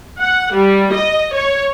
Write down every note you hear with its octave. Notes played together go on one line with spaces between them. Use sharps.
F#5
G3
D#5
C#5